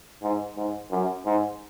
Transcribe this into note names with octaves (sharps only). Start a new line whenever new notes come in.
G#2
G#2
F#2
G#2